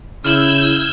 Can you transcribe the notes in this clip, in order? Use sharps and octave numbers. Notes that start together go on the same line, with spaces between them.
C#3 E4 E6 F6 G6 G#6 E7 F#7